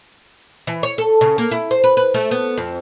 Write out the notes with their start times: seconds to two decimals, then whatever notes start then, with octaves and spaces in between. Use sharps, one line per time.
0.67 E3
0.83 C#5
0.98 A4
1.21 C#3
1.38 A#3
1.52 E4
1.71 C5
1.84 B4
1.97 B4
2.14 A3
2.31 B3
2.58 F2